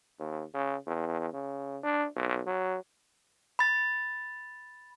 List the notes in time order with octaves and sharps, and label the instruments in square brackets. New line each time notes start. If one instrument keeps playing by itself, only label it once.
[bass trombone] D#2
C#3
E2
C#3
D4
B1
F#3
[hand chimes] B5 A6